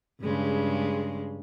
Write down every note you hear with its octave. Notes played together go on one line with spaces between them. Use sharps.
G2 C#3 G#3